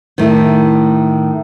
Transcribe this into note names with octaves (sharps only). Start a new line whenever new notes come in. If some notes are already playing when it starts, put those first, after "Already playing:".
A2 D#3